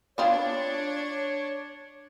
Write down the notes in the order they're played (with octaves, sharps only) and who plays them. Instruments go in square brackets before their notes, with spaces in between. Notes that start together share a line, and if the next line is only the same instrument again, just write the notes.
[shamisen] B3 C4 F4 [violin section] D4 [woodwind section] C#5